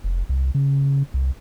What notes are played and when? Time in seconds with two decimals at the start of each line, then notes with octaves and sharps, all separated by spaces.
0.04 F1
0.29 C2
0.55 C#3
1.14 C2